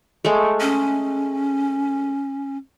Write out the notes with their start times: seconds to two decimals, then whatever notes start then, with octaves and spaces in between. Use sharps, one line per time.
0.25 G#3 A3
0.60 C#4